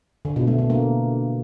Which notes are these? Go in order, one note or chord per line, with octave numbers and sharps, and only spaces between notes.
D3
B2
A3
D3
A#3